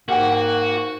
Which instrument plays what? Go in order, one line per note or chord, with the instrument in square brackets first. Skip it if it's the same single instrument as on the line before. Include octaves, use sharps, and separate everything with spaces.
[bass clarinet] G#2 [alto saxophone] A#3 [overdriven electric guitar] F#4 [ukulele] G4 F#5 G5